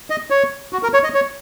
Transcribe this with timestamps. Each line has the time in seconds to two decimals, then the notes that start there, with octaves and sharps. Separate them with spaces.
0.10 D#5
0.30 C#5
0.73 F#4
0.83 A#4
0.94 C#5
1.04 D#5
1.14 C#5